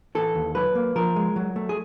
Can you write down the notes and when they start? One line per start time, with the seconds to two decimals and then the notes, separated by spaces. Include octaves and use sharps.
0.15 E3 A4
0.35 D#2
0.55 F#3 B4
0.75 A#3
0.96 F3 A#4
1.16 G#3
1.36 F#3
1.56 A3
1.69 G#4